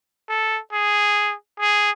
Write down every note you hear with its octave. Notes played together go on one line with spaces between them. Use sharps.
A4
G#4
G#4